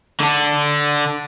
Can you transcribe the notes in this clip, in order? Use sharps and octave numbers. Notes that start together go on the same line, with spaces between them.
D3 D4